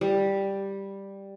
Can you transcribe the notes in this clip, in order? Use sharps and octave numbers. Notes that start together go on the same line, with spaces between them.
G3